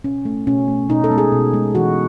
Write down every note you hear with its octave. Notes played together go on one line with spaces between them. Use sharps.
B2 C#4
A3
B2 C#4
A3
B2 D#4
A4
G#3 B3
G#4
B2
G#3 B3
E3 F#4